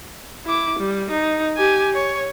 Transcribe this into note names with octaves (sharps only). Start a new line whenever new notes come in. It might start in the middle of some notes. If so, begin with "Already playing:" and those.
E4 D6
G3
D#4
G4 G#5
C#5